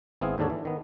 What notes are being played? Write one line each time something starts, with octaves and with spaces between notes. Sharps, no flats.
G#1 B3 C4 E4 G#4 F5
D#2 G#2 D3 D4 A4 C#5
E3
D#3 B3